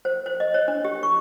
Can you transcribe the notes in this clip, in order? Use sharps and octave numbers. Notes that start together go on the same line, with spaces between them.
C5
C5
D#5
C#5
D4
G4
C#6